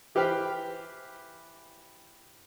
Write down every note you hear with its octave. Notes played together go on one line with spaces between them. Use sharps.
E3 G4 B4 C5 G5 F6